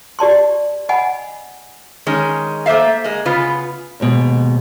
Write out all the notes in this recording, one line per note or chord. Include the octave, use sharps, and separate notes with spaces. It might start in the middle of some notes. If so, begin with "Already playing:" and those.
G4 D5 A5 C6
D#5 F#5 G#5 B5
D#3 G#3 C#4
A3 A#3 C5 E5 F5
G#3 A#3
C#3 B3 F4 B4
D#2 G#2 B2